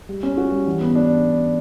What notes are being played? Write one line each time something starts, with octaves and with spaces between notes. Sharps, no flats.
G3
C#4
F#4
G3
E3
B3
D4